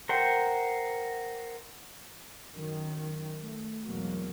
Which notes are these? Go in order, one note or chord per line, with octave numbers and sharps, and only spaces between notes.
A#4 C5 F#5 G5
F#2 D#3
A3
E2 G#2 B2 F#3 A#3